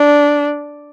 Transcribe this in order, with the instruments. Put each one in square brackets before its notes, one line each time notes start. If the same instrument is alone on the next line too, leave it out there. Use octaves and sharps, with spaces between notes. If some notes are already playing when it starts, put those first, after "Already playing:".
Already playing: [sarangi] D4